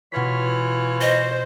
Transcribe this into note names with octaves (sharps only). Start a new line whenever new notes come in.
B2 E3 F4 C#5 B6
C5 D#5